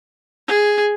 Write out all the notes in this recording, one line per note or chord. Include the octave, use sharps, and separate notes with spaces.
G#4